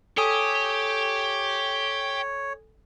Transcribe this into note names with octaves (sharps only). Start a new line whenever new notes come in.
G4 A4 C#5 G#5 D#6